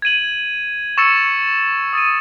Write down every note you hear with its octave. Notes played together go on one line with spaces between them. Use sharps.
G#6 D#7 F#7
C#6 E6 A6 C#7 E7
D#6 A6 D#7